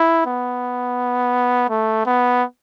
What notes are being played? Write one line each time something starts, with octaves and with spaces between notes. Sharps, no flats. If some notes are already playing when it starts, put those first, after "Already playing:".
Already playing: E4
B3
A3
B3